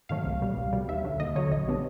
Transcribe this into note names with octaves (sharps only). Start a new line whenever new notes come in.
G#2 D#3 F#3 A3 F5
C2
B2 G3
C2
B2 G3
D#2 E5
D3 F#3
D#2 D#5
D3 F#3 C#5
A#1 D#5
A#2 G3 B3 D4